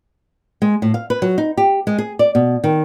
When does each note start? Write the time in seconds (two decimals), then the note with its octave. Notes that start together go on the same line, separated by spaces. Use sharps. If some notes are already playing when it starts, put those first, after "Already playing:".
0.62 G#3
0.82 A2
0.94 F5
1.10 B4
1.22 F#3
1.38 D#4
1.57 G4
1.87 G#3
1.98 G#4
2.19 D5
2.35 B2
2.64 D#3